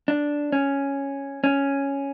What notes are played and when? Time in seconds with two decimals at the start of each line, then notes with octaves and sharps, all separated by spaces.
0.08 D4
0.52 C#4
1.44 C#4